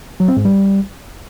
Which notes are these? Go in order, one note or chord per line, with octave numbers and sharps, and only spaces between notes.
F#3
C4
G#2
G3